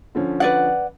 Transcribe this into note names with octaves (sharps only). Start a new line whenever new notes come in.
D3 F3 C#4
B4 D5 F#5